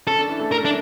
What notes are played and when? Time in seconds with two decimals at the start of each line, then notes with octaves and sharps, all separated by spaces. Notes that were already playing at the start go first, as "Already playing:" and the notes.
0.07 C#4 A4
0.19 D4
0.29 E3 E4
0.39 A3 A4
0.51 A3 A4 A#4
0.65 D4